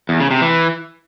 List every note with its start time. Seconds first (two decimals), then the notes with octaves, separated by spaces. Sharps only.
0.09 E2
0.20 C#3
0.31 C3
0.42 E3